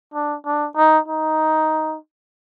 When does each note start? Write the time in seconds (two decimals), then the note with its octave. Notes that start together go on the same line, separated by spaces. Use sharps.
0.14 D4
0.46 D4
0.77 D#4
1.08 D#4